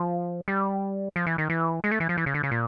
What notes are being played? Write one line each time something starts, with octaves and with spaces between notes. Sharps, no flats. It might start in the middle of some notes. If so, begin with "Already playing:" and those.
Already playing: F3
G3
F3
E3
D#3
E3
G#3
A3
E3
F3
E3
C#3
D3
C#3
A#2